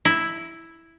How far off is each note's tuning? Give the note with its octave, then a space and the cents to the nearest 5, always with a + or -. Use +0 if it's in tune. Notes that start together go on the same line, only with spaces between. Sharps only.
E4 +0